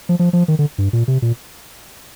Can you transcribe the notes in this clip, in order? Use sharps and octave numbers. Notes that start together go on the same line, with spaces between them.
F3
F3
F3
D#3
D3
G2
A#2
C3
A#2